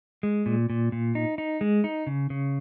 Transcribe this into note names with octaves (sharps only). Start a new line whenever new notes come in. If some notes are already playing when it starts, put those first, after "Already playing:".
G#3
A#2
A#2
A#2
D#4
D#4
G#3
D#4
C#3
C#3